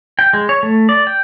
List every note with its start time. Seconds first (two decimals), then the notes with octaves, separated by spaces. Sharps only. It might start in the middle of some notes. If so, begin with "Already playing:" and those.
0.19 G5
0.33 G#3
0.49 C#5
0.63 A3
0.89 D5
1.07 G5